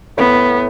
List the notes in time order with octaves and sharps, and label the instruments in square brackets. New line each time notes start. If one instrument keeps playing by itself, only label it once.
[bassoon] A2 [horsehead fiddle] B3